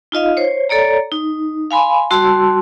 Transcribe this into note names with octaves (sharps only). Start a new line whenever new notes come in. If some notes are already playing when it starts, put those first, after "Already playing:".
D#4 F4 D#5 F5
C5 C#5
A4 C#5 D5 A#5
D#4
F5 G#5 B5 C6
G3 F#4 A5 C6 E6